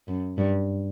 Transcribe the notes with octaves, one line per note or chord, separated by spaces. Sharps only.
F#2
G2